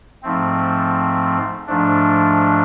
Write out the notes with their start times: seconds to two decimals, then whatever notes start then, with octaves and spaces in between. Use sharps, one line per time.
0.23 G#2 F3 A3 C4
1.67 G#2 F3 A3 D4